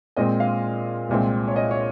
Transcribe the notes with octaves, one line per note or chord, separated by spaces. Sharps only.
A#2 G#3 C4 D#5
F5
C2 A#2 G#3 C4
C#5
D#5
C#5